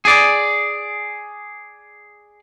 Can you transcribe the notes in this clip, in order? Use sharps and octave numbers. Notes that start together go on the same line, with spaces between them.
G#4 D5